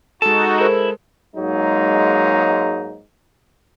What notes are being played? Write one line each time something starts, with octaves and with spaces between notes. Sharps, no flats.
G#3 D#4 F#4 A4 A5
E4 G#4 A#4 C5
G#2 F#3 G#3 A#3 D#4